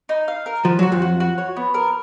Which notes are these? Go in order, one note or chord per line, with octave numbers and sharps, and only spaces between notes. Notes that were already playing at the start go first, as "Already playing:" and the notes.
D#4
F5
A#4
F3 F#4
F#3 F#4
F2 F3
F#4
F#4
C#5
B3
A#4